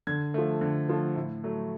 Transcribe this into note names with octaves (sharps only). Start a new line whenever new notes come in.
D3 G#6
F3 A3
D3
F3 A3
A2
F#3 A3